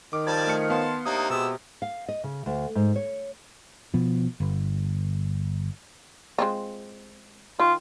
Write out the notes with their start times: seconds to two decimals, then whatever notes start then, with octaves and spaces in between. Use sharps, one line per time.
0.13 D#3 D6
0.27 F3 G3 D5 A5 G#6
0.47 A3 F6 C#7
0.70 B3 F5 A5 C6
1.06 C3 A#3 D4 D#4 D#6
1.30 B2 G#3 B3 G4 E6
1.82 F5
2.08 D#5
2.24 C#3
2.46 D2
2.75 G#2
2.96 C#5
3.94 B2 F3
4.40 G1
6.38 G#3 C4 F4
7.59 D#3 F4